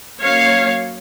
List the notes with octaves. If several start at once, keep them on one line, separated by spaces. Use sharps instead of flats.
F#3 A#3 C#4 C#5 F5